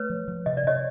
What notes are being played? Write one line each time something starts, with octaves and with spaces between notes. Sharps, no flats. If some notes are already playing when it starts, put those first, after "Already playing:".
Already playing: A3 B4 C#5
F3
F3
C3 D#5
D5
C3 C#5 D#5